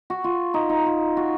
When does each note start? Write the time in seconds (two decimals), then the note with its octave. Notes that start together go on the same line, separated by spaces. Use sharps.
0.10 F#4
0.24 F4
0.54 D#4
0.69 D#4
0.86 F4
1.17 F#4